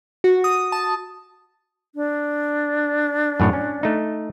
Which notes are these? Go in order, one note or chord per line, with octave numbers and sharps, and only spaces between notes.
F#4
D#6
A5
D4
F#2 A2 C#5
C#4
A3 D#4